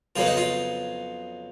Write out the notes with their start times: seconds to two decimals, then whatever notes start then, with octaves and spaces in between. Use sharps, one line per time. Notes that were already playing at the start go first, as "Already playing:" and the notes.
0.16 F2 C#3 F#3 B3 F4
0.26 D#4
0.37 F4